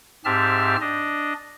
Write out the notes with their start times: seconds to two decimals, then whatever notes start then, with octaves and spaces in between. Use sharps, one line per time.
0.25 G#2 C4 G4 E5 A5 F6
0.81 D4 D#5